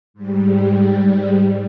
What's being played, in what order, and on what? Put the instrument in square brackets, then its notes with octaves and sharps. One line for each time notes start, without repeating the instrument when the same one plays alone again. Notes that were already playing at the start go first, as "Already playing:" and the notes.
[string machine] G#2 G3